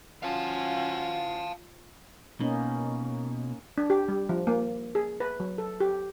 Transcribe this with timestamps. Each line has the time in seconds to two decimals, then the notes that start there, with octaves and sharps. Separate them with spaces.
0.23 C#4 F4 F#4 F5 A5
2.40 B2 A#3 C#4 D#4
3.78 D4
3.90 G4
4.08 G3
4.29 F3
4.47 A#3
4.95 G#4
5.20 B4
5.40 F#3
5.58 A4
5.80 G4